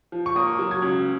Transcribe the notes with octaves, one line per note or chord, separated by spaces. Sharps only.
F3
C#6
A#3 D#6
F#3
G#6
C#2